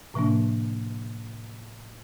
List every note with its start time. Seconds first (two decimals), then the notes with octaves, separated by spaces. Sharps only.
0.14 A2 C3 F3 A#3 D4